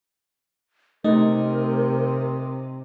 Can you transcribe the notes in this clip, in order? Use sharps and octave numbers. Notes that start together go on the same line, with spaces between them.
C3 A3 D#4 A#4